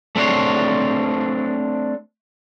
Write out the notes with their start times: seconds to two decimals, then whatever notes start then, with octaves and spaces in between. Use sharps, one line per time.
0.16 A3 C4 D4 C5 C#5